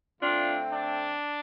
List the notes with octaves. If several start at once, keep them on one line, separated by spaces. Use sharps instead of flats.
D3 A3 C4 D4 F4
D4